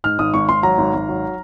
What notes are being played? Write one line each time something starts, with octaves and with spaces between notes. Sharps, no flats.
G#2 F6
G#1 D#6
G#1 C#6
G#1 C6
F#3 A#5
G#1
G#1
F#3